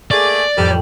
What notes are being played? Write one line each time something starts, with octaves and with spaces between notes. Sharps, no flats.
A3 A#3 G#4 D5
F2 A2 C3 G3